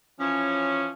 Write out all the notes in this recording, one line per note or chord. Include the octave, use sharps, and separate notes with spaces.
E3 F3 C#4